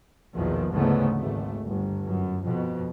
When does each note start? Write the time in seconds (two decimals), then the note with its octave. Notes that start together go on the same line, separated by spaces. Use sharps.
0.36 A#1 E2 B2 D#3 F3
0.72 D2 G#2 C#3 E3 A3 B3
1.18 G#1 A3
1.67 G1
2.08 F#2
2.46 F2 B2